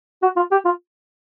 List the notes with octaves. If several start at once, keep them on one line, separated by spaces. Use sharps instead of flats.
F#4
F4
G4
F4